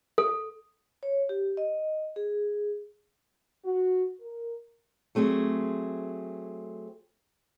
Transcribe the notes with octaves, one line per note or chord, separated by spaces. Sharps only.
A4
C#5
G4
D#5
G#4
F#4
A#4
F#3 A3 C4 G#4